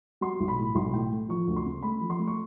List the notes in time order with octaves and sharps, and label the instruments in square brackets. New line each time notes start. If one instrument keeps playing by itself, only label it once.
[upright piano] F#3 C6
B1
B5
A2
B1 C6
A2 G5
A3
F3 C#6
D2
C6
C#3
A3 B5
F3
C6
A3
C#6